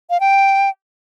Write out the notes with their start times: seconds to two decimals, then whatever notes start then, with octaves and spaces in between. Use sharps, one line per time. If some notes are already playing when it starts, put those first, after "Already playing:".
0.10 F5
0.20 G5